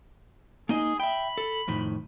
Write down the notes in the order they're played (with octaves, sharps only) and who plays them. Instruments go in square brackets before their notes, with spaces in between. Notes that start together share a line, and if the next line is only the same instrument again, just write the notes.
[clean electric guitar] A#3 D#4 D#5 [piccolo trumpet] G#4
[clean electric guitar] E5 G5 [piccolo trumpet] B5
[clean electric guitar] A4
F2 A2 D#3